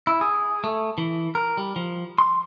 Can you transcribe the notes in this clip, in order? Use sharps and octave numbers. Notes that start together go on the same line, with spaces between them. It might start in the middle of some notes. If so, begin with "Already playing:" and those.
E4
G#4
A3
E3
A#4
G3
F3
C6